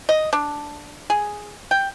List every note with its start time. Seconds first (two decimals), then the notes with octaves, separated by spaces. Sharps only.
0.09 D#5
0.33 D4
1.10 G#4
1.71 G5